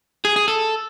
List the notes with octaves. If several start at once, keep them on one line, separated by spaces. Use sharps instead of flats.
G#4
G#4
A4